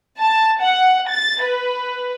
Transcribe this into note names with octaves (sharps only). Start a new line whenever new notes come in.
A5
F#5
A6
B4